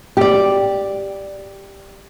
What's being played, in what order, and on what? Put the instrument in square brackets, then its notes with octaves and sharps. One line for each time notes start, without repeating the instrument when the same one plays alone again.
[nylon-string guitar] G4 D5